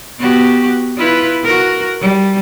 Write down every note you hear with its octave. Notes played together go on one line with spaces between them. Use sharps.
B3 F#4 G4
E4 F4 B4
F#4 A#4
G3